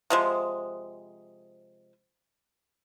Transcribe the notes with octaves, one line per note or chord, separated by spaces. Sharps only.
C3 F3 G#3